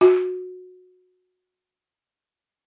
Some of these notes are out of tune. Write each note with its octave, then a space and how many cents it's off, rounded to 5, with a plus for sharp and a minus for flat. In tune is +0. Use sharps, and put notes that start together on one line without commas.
F#4 -20